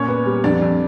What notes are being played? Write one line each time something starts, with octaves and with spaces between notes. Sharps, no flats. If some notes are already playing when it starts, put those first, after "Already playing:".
Already playing: A#2 C#4 C#5
B3
G3
F2 D4 D5
F2